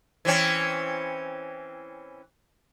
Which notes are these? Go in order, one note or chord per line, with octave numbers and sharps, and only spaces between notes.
E3 C4 C#4